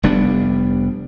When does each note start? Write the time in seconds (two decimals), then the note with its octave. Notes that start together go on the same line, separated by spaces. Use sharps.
0.03 F1 G3 B3 D4